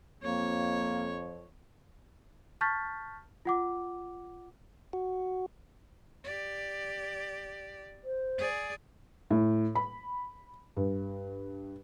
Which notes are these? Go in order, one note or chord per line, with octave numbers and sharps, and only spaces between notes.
F2 A#3 C#5
A5 C#6 F6 G6 A6 B6
F4 F#5 D6
F#4
G4 D5
C5
G#4 D5
A2
B5
G2